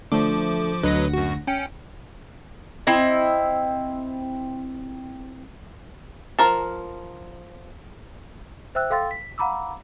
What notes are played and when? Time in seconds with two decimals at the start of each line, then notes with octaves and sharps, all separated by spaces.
0.12 D3 F3 A3 D6
0.83 D2 F#3 B4 D#5 F#5 A#6
1.13 F#2 F#4
1.47 C#4 G5 C#7
2.87 C4 E4 D#5
6.39 F3 A#4 A5
8.75 C5 E5 G5 E6 F#6
8.90 A4 F5 G5 C6 E6 A6
9.11 B6
9.38 F5 F#5 A#5 B5 D6 E6